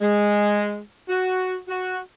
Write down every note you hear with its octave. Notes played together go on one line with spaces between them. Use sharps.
G#3
F#4
F#4